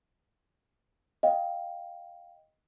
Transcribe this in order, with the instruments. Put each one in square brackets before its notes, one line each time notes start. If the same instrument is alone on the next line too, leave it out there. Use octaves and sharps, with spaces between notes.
[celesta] D#5 F5 G5